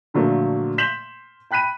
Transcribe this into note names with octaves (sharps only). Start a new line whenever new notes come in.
A#2 D3 F3 F#3 A3 A#3
C6 G6 B6 E7 F#7
G5 B5 F#6 B6 D#7